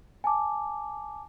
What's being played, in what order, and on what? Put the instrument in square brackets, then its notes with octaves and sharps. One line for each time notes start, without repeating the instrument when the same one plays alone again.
[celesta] G#5 A5 D6